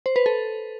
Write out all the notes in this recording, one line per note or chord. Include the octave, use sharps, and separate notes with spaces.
C5
B4
A4